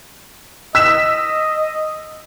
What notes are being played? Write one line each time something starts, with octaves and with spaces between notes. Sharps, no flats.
D#5 E6 B6 E7